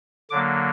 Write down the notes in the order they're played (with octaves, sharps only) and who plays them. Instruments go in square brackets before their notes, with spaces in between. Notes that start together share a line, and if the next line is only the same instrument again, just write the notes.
[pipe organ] D3 F#3 A#3 D6